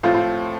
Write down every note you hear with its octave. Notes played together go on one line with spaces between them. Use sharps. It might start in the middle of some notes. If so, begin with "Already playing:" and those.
A2 F3 A3 C4 F4
F4